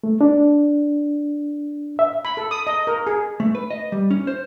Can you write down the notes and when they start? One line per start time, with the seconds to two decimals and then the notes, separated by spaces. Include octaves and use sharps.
0.04 A3
0.21 D4
1.99 E5
2.25 B5
2.37 A4
2.51 D#6
2.67 D#5
2.87 A#4
3.07 G#4
3.40 A3
3.55 B4
3.71 D#5
3.92 G3
4.11 C#4
4.27 C5